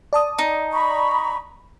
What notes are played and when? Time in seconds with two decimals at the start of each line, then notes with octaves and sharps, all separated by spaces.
0.13 D5 A5 D#6
0.39 D#4
0.73 A#5 B5 C#6